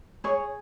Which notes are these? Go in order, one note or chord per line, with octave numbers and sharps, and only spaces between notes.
G#4 C#5